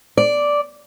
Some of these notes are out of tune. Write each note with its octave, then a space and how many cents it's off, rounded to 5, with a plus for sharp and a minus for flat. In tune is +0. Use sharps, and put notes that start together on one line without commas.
D5 -5